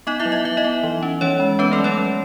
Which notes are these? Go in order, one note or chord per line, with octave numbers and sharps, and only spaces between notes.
B3 D#4 D#5
E4 E5
F#3
D#5
F#3 E5
D#4 D#5
B3
E3
C#4
E3 C#4 C#5
G#3
B3 C#4 B4
A3 A4
F#3
C#4 C#5
F#3